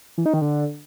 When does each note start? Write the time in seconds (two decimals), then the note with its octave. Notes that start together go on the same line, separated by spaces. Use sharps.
0.18 E3
0.26 D#4
0.34 D#3
0.42 D3